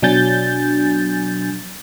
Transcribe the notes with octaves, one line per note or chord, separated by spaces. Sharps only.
B2 F#3 D4 G#5 G6 A6